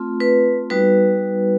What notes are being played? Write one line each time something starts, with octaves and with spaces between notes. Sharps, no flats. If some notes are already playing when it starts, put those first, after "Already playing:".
Already playing: A3 C4 F4
B4
G3 B3 D#4 F#4 B4